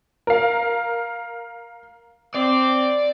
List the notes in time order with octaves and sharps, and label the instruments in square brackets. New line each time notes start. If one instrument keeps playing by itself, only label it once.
[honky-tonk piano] A#4 F5
[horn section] C4 [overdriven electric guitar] D5